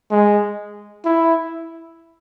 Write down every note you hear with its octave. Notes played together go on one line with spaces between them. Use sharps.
G#3
E4